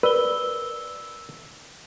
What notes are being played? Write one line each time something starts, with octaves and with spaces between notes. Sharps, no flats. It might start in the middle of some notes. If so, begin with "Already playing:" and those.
A#4 B4 D5 E6 G7